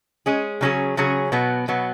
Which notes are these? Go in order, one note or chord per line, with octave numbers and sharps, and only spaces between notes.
G#3 C#4 G#4
C#3 F#3 C#4 G#4
C#3 F#3 C#4 G#4
B2 F#3 B3
B2 F#3 B3